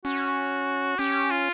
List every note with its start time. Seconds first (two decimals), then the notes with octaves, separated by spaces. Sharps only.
0.05 C#4 F#4
0.99 C#4 G4
1.31 F4